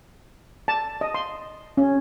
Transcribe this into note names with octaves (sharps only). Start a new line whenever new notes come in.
A5
D#5
C6
C#4